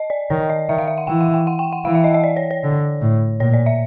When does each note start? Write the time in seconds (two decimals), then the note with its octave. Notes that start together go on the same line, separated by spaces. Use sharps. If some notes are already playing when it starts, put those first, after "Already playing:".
Already playing: D#5
0.10 D5
0.30 D#3 C#5
0.50 D#5
0.69 D#3 E5
0.78 F5
0.88 E5
0.98 F#5
1.07 E3 G5
1.21 F#5
1.34 G5
1.47 F#5
1.59 G5
1.73 F#5
1.85 E3 F5
1.95 E5
2.04 D#5
2.14 D#5
2.24 D5
2.37 C#5
2.51 C#5
2.64 D3
3.01 A2
3.40 A#2 C#5
3.54 D5
3.66 E5